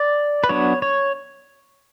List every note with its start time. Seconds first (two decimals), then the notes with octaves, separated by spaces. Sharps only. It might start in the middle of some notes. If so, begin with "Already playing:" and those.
Already playing: D5
0.44 B4
0.49 F#3 B3 D4 C#5
0.82 C#5